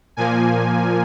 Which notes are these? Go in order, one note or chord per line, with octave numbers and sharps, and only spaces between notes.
A#2 F3 A#3 G#5